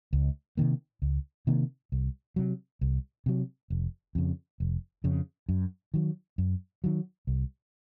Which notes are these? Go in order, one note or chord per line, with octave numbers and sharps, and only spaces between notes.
C#2
C3 D#3 A#3
C#2
C3 D#3 A#3
C2
C3 F#3
C2
C3 F#3
F1
F2 C#3
F1
F2 C#3
F#2
D#3 F#3
F#2
D#3 F#3
C2